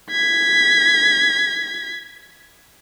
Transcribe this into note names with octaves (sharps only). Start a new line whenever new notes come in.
G#6 B6